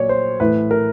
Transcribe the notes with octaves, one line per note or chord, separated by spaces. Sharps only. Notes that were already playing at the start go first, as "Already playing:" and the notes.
Already playing: A#2 F#3 C#5 D5
C5
A2 E3 B4
A#4